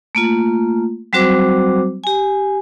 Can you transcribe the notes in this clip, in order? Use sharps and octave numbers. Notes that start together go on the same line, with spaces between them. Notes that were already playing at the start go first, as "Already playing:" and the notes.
A3 A#3 F4
F#3 G3 C4 F#4 C5 D6
G4 G#5